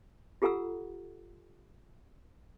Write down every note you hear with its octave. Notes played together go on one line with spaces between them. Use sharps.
F4 G4 A4 F#5 A#5 E6